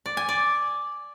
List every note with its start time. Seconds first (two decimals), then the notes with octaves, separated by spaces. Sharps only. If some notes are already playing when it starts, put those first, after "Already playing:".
0.06 D5
0.17 G#5
0.29 D5